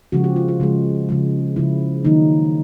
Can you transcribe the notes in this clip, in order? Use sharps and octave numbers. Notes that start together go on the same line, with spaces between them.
C#3 F3 G#3 F#4
G4
F4
F4
C#3 F3 G#3
C#3 F3 G#3
C#3 F3 G#3 E4
D#3 F#3 A#3 D#4